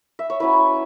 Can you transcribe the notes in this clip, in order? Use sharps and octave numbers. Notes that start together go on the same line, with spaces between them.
E5
C#5
F#3 C#4 E4 B4